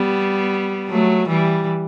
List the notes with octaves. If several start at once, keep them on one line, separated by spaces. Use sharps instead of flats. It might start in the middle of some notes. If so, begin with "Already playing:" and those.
Already playing: G3 B3
F#3 A3
E3 G3